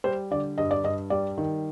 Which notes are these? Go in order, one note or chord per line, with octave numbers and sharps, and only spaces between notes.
G3 C5
D3 D5
G2 D#5
D5
G2 D#5
G3 D5
D#3